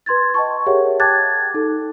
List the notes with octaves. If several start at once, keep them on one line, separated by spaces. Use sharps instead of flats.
B4 C6 G#6 A6
D#5 G5 A5 C#6
G4 G#4 A#4 C#5 E5 F#5
G5 A5 D6 F#6 G#6 A6
D#4 A4